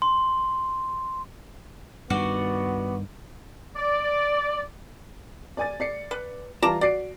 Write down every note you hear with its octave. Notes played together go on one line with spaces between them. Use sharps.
C6
G2 D#3 B3 F#4 D5
D5
D5 G#5 A6
D5 C7 C#7
B4
E3 G3 F4 D5 A5 A#5
F#4 D5 C7 D7